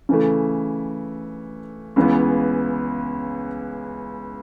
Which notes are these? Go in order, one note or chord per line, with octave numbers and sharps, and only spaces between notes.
C#3 E3 A3
C#2 C#3 E3 B3